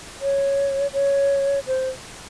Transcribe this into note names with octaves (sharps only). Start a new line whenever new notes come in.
C#5
C#5
C5